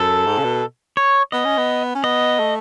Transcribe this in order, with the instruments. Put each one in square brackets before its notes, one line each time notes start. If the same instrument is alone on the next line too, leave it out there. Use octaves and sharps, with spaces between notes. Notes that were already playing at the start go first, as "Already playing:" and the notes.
Already playing: [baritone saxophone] F#2 [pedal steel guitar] A4
[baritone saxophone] G#2
C#3
B2
[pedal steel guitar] C#5
[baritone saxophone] B3 [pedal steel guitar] D#5
[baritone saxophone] C#4
B3
C#4
[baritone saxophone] B3 [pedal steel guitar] D#5
[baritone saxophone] A3